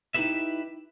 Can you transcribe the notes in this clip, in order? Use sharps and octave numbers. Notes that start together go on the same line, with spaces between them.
D#4 E4 G4 G#4 B4 E5